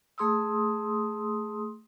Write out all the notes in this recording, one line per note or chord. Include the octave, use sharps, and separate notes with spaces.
A3 G#4 C6 D#6 E6